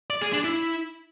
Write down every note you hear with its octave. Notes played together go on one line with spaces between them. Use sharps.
D5
G#4
D4
E4